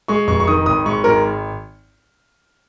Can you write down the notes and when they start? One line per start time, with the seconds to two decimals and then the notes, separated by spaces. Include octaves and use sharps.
0.08 G#3 C#6
0.27 F1 C#6
0.40 C#6
0.47 D#3 D#6
0.66 G#1 D#6
0.86 G#2 C#6
1.04 G#1 A#4